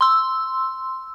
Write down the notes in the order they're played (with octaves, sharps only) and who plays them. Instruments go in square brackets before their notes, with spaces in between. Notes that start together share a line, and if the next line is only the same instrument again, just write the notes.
[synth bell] C6 E6